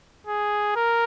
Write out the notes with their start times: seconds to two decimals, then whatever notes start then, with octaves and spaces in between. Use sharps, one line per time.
0.27 G#4
0.76 A#4